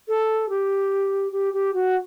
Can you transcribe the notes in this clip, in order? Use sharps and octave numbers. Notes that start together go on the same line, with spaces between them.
A4
G4
G4
G4
F#4